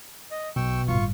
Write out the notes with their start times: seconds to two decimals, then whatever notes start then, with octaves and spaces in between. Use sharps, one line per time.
0.31 D#5
0.56 B1 B2 G5 C#6 E6
0.88 G1 A2 F4 C#6